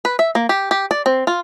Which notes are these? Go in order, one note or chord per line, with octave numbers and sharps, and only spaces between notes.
B4
E5
A#3
G4
G4
D5
C4
F4